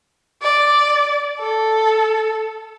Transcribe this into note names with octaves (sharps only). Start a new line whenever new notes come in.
D5
A4